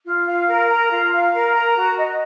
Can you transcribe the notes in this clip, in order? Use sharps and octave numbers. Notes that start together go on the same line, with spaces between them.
F4
F5
A#4
A#5
F4
F5
A#4
A#5
F#4
D#5